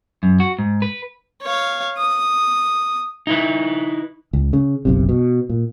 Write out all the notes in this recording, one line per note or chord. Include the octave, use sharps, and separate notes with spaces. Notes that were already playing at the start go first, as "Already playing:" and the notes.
F#2
F#4
G#2
B4
C#5 F5
D#6
D#4 E4 B4
C#2
C#3
F#1 B1 C3
B2
A#2